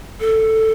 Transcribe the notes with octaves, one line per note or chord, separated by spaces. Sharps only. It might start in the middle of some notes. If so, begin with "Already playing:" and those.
A4